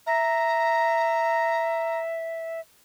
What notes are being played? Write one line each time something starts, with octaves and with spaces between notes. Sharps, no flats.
E5 A#5